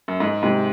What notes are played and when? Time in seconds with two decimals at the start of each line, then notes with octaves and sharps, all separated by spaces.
0.08 F#2
0.20 G#2 G#3
0.43 G#2 C3